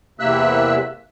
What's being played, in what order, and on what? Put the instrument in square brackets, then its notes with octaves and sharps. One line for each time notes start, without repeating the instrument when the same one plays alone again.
[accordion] E2 C3 A#3 E5 E6 F#6